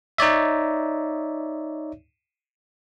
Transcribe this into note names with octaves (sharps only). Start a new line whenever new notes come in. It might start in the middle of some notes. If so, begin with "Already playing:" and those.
D#4 C#5 D5 E5